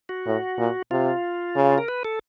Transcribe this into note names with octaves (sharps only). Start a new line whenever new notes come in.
F#4
A2
A#2
C3 F4
C#3
A#4
B4
A4